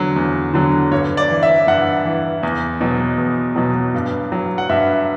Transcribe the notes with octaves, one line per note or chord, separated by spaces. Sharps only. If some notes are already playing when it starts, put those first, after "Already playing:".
Already playing: E2 D3 F#3
E2
D3 F#3
G2 C#5
D5
E3
E5
G2 F#5
E3
E2
B2 F#3
E2
B2 F#3
G2
F#3
F#5
G2 E5